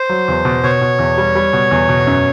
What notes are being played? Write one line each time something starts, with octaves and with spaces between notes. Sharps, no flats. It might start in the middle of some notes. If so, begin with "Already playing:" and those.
Already playing: C5
F#3
E2
B2
B2 C#5
B2
E2
G3
G3
B2
E2
B2
F#2